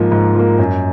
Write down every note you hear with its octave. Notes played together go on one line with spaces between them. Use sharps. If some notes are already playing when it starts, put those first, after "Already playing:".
Already playing: G#2 F3 A#3
G#2
F3 A#3
F#2